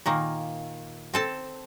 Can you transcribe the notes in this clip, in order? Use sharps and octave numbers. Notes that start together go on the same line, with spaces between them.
A#2 D#3 A#3
C4 A4 A5